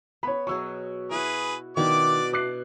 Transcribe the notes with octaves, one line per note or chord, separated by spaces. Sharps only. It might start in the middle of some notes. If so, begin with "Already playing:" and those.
B3 C#5 B5
B2 F#3 G#4 C#6 E6
E4 F#4 G#4 B4
B2 D#3 D4 E4 D5 D6
D5 D6 F#6 C7